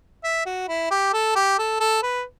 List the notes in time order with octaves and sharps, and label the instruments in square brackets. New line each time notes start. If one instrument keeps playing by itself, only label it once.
[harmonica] E5
F#4
E4
G4
A4
G4
A4
A4
B4